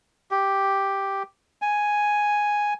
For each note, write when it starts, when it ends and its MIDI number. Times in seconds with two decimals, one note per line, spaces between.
0.31 1.23 67
1.62 2.74 80